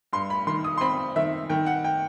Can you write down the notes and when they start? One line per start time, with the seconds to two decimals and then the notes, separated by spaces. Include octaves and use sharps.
0.13 G2 C6
0.30 B5
0.47 D#3 C6
0.64 D#6
0.78 C6
0.81 C4 B5
1.16 D#3 E5
1.50 D#3 G5
1.66 F#5
1.84 G5